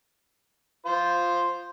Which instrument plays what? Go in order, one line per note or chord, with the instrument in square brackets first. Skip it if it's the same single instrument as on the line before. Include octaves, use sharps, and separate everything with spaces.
[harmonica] F4 C5